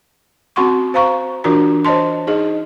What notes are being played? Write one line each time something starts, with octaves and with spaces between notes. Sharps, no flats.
C4 C#4 F#4 F#5 C6 C#6
C5 F5 A#5 C#6
E3 D4 F4 F#4 A#4 A#5
C5 C#5 D#5 A5 C6
D#4 G#4 D#5